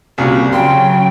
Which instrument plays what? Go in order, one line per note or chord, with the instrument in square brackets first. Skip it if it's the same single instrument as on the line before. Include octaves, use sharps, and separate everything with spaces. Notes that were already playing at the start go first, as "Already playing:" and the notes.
[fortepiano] C2 A#2 C#3 [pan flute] F#4
[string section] C#3 F#3 [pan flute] G5 [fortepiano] C6